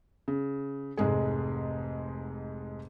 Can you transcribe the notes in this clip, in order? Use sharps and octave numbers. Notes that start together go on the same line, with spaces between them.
C#3
F1 G#2 G#3 G#4